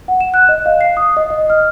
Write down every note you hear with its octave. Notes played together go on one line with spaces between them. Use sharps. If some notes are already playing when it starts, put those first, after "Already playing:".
F#5
E7
F#6
D#5
F5
C7
D#6
D#5
D#5
F6